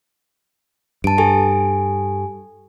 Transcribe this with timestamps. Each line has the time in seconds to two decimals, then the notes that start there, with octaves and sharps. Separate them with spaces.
1.04 G2 A5 D7
1.18 G4 A4 G#5